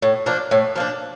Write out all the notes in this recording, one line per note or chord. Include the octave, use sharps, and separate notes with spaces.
A2
F3 A#3 D4
A2
F3 A#3 D4